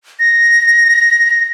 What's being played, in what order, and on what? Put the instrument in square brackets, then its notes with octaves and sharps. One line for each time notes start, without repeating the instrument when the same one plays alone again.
[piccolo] A#6